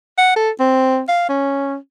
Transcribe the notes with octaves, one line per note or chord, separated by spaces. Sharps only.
F#5
A4
C4
F5
C#4